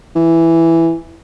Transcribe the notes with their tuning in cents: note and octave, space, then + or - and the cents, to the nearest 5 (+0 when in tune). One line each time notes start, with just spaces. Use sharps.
E3 +5